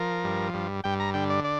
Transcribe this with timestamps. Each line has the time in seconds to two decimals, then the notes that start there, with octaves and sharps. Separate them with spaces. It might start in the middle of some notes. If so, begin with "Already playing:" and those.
Already playing: F3 A#4
0.24 G2
0.54 G2
0.84 G2 G5
1.00 A#5
1.14 D3 G5
1.30 D5
1.44 D5